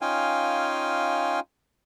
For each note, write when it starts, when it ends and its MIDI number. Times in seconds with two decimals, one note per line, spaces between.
0.01 1.40 61
0.01 1.40 63
0.01 1.40 65
0.01 1.40 77
0.01 1.40 79
0.01 1.40 80